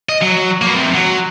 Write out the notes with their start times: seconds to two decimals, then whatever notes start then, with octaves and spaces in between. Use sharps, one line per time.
0.09 D#5
0.22 F#3
0.62 A#3 B3
0.75 C3 F3
0.94 F#3